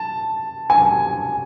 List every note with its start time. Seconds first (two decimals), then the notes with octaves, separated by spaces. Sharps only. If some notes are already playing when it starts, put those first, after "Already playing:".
Already playing: A5
0.70 G#5